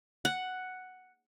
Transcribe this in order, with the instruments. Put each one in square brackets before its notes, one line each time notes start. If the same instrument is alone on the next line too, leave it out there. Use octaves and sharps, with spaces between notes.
[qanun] F#5